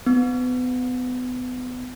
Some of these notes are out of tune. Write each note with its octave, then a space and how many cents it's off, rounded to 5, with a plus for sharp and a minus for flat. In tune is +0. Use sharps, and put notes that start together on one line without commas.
B3 +30